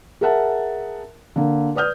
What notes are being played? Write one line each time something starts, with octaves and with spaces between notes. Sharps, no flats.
G#4 A#4 E5 F#5 A5
D3 A#3
B4 D5 D#6 F6 G6